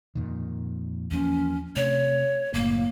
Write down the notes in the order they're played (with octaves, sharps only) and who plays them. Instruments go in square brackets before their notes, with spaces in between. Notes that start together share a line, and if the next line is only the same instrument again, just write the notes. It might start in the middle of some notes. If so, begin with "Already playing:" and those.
[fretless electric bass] F2 A#2 D#3
[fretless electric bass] E2 F3 A#3 [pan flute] C#4
[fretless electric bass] C3 A3 [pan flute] C#5
[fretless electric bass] F#1 A2 [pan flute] A#3